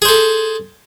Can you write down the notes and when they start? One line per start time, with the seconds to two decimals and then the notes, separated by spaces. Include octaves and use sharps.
0.02 G#4
0.05 C5
0.09 A4